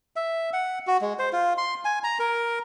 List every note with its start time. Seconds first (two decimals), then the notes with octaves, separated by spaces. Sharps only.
0.16 E5
0.53 F#5
0.87 F#4
1.01 G#3
1.19 C5
1.33 F4
1.58 C6
1.85 G#5
2.04 A#5
2.19 A#4